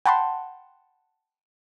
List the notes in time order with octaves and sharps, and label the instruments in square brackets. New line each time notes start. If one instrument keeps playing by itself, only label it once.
[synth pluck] F#5 G5 A5 B5 C6